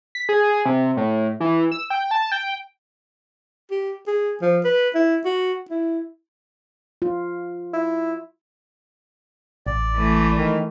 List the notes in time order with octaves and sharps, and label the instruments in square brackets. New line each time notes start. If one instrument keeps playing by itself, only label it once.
[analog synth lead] B6
G#4
C3
A2
E3
E6
G5
A5
G5
[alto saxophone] G4
G#4
F3
B4
E4
F#4
E4
[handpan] F4
[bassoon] E4
[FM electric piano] A1 [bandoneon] D5
[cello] E3 A3
[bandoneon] D#3